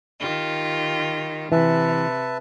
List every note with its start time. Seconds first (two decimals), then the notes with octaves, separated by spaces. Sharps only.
0.20 D#3 F4 G4
1.52 C3 E3 B4 E5 A5